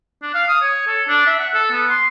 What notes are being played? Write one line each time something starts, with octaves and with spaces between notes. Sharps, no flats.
D4
F5
D#6
C#5
A4
D4
E5
F#5
A4
B3
C6